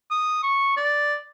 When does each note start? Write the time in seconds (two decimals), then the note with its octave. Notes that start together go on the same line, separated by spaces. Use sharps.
0.11 D#6
0.43 C#6
0.77 D5